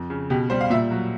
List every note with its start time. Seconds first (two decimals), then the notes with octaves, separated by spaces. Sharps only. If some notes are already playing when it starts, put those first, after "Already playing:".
Already playing: F2
0.10 C#3
0.30 B2 G4
0.50 G3 C5
0.61 F5
0.70 A#2 E5
0.91 F#3